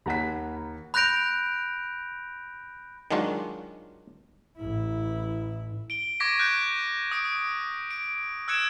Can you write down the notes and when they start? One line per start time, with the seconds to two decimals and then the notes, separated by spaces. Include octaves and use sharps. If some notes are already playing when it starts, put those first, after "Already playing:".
0.06 D#2 F#5 A#5 B5 B6
0.94 B5 F#6 G6 A#6 D7 F7
3.11 D#3 F#3 G#3 D4 F4 F#4
4.57 A1 E4
5.90 D7 G7
6.20 C#6 D6 G#6 A#6 B6 D7
6.39 C#6 F#6 G6 D7
7.11 D#6 D7
7.91 D7
8.48 E6 F#6 G#6 C#7 D7 E7